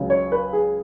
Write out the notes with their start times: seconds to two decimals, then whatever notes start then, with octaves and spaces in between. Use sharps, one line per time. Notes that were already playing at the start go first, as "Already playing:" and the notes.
Already playing: C#2 C#3 F#3
0.10 C#5
0.32 B4
0.53 G#4